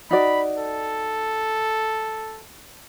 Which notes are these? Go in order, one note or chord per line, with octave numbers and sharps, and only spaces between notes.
D#4 F#4 D5 B5
A4